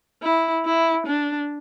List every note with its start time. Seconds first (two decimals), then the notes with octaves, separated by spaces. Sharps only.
0.22 E4
0.65 E4
1.06 D4